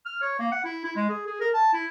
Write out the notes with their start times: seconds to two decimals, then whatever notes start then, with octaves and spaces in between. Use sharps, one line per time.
0.06 F6
0.22 C#5
0.39 A#3
0.52 F#5
0.64 E4
0.84 E4
0.96 G#3
1.09 G#4
1.27 G#4
1.40 A#4
1.54 A5
1.73 E4